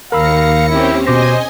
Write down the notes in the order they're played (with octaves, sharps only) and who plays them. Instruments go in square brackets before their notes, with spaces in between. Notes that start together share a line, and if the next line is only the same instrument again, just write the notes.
[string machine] D#2 A#6 C#7 [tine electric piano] A#4 B5 E6 [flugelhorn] F5
[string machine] C4 C#4 G4 [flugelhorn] E4
[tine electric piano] B2 D6 A#6 [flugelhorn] C5 [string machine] D#5 G#5